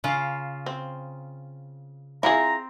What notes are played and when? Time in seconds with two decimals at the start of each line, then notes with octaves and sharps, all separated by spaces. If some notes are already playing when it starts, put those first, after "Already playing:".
0.04 C#3 F4
0.66 C4
2.23 C4 E4 F4 G#4 A#5